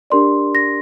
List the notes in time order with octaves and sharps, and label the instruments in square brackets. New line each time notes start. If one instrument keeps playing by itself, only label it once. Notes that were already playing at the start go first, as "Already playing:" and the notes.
[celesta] D4 G4 A#4 D5 C6
A#6